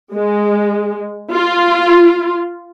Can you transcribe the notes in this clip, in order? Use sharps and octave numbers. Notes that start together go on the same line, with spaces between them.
G#3
F4